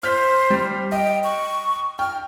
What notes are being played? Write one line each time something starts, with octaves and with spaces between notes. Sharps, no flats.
C5 F6 G6 B6
G3
D#5 G5
C#6
G5 F6